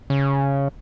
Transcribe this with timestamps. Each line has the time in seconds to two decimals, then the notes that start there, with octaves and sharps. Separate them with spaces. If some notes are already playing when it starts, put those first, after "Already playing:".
0.10 C#3